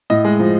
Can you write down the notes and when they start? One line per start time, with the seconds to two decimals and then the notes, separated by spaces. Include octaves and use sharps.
0.10 A2 D#5
0.25 G#3
0.40 F3